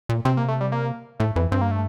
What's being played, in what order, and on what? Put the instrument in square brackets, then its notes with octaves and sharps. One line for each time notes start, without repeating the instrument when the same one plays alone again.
[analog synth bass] A#2
[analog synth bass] C3 [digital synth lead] C4
[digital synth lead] A#3
A3
G3
A#3
[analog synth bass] A2 [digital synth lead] A3
[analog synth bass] F2 [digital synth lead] E3
[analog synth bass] G2 [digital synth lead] C4
[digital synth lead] A#3
A3